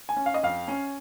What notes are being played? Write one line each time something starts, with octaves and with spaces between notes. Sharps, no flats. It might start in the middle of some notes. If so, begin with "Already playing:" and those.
G#5
C#4
F5
D#5
F2 F5
C#4